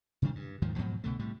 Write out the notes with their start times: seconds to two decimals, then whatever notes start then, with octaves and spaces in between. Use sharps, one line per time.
0.22 C3 D#3 G3 D4
0.35 G2
0.62 D#2 G#2 D#3 F3
0.76 G#2 B2 F3 F#3
1.04 C2 B2 D3 A3
1.19 A2 C3 G3